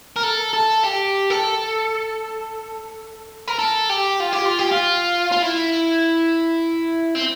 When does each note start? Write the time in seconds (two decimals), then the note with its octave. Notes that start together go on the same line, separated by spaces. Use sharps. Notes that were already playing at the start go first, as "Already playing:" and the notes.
0.16 A#4
0.23 A4
0.54 A4
0.84 G4
1.30 A4
3.48 A#4
3.59 A4
3.89 G4
4.20 F4
4.33 G4
4.45 F4
4.59 G4
4.71 F4
5.32 F4
5.42 E4
7.15 C4